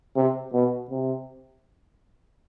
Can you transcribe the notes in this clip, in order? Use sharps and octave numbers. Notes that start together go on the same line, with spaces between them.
C3
B2
C3